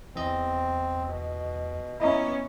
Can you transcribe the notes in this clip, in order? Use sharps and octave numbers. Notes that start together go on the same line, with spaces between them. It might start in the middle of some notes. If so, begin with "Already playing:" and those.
E2 C4 D#5
B2
B3 C#4 E4 D#5 A#5